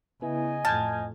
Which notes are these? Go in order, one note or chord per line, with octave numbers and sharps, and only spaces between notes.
C#3 B3 E4 D#5 G#5
F2 A2 A5 F6 G6 G#6